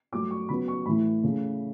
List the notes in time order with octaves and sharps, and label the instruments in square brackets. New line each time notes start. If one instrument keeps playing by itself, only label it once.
[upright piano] G2 F#3 A3 D6
C#6
C#3 F#3 B3 B5
C#6
A2 E3 A3 B5
C#3 E3 A3